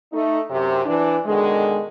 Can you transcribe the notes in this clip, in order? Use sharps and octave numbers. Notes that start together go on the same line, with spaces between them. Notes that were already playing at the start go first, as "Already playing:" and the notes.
A3 D#4
F#2 C3
E3 D4
B2 D3 D#3 G#3